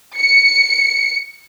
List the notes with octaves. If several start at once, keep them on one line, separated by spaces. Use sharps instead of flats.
C#7